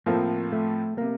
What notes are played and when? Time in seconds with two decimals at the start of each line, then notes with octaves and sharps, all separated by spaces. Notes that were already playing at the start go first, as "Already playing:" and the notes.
0.06 A2 F3 A#3 C4 F4 A4
0.52 A3
0.98 C3 A#3